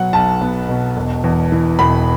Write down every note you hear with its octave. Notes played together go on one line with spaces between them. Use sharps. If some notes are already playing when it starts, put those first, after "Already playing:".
Already playing: B2 F#3 B3 F#5
B1 A5
B3
B2
E1
E2
E3
E1 B5